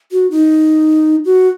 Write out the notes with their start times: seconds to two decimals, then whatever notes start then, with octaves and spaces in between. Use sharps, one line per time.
0.12 F#4
0.31 D#4
1.25 F#4